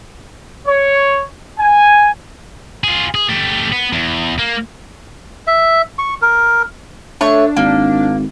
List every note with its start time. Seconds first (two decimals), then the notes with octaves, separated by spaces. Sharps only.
0.67 C#5
1.59 G#5
2.84 F4 G#4
3.15 G#4
3.29 A3 G4
3.72 B3
3.93 E2
4.38 A#3
5.47 E5
5.99 C#6
6.22 A#4
7.21 A3 D4 C#5 C#6
7.57 G#1 A#3